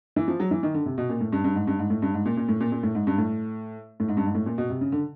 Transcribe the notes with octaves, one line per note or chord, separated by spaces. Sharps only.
E3
F3
F#3
E3
D#3
D3
C3
B2
A#2
A2
G2
G2
G#2
G2
G#2
A2
G2
G#2
A#2
A#2
A2
A#2
A#2
A2
G#2
G2
A2
A2
G#2
G2
G#2
A2
A#2
B2
C3
C#3
D3